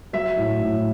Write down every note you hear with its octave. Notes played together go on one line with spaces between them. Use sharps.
F#3 E5
A2
A2